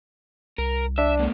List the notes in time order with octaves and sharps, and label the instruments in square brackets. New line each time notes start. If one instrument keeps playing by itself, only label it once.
[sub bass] C2 [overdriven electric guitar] A#4
[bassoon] D4 [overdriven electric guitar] E5
[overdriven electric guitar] B2 A3